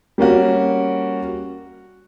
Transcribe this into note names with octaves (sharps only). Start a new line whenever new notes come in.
G3 A#3 C#4 F#4